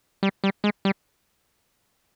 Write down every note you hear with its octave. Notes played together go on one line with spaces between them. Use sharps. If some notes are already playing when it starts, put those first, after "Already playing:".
G3
G3
G#3
G3